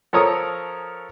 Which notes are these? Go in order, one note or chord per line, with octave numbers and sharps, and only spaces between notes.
F3 A4 A#4 C#5 A#5 D#6